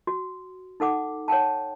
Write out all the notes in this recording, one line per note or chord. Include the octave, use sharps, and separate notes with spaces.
F#4
D#4 A4 F#5 D6
C#5 F#5 G5 A5